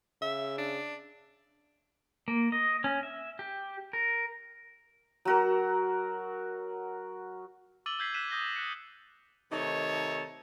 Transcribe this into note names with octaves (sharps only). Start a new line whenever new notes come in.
C#3 E5
D4
A#3
D#5
C#4
E5
G4
A#4
F#3 F#4 A#4
D6 E6 A6 D#7 F#7 G7
E6 G6 G#6 B6 C7
F#6 B6 D#7 E7
D#6 G6 A#6 G7
F#6 C#7
C3 D#3 A3 D#4 C#5 A5